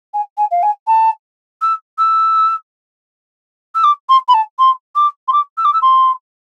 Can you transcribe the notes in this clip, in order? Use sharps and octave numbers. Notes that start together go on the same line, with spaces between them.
G#5
G#5
F5
G#5
A5
E6
E6
E6
D6
C6
B5
A5
C6
D6
C6
D6
E6
D6
E6
C6